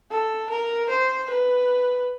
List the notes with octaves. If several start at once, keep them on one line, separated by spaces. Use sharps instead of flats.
A4
A#4
C5
B4